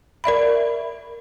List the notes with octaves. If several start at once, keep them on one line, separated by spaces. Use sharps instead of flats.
A#4 D5 E5 B5